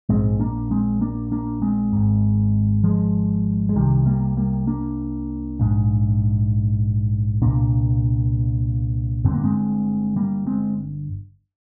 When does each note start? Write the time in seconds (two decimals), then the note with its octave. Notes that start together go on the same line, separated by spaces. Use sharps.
0.09 A#1 G#2 G#3 C4
0.40 A#3 D4
0.71 G#3 C4
1.01 A#3 D4
1.32 A#3 D4
1.62 G#3 C4
1.93 G#1 G#2
2.84 F3 G#3
3.69 G#3
3.76 C2 C3 D#3 G3
4.06 G3 A#3
4.37 G3 A#3
4.67 A#3 D4
5.59 A#1 G#2
7.42 C2 A#2 A#3 D4
9.25 G1 G2 D3 C4
9.34 A#3
9.44 G#3 C4
10.16 G3 A#3
10.47 G#3 C4